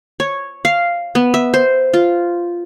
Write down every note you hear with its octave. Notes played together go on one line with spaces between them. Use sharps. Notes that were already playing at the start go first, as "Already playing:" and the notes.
C#5
F5
B3
E5
C5
F4